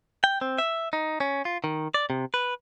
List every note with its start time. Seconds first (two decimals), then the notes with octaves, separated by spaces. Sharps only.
0.24 G5
0.41 C4
0.58 E5
0.93 D#4
1.20 C#4
1.45 F4
1.64 D#3
1.94 D5
2.10 C3
2.34 B4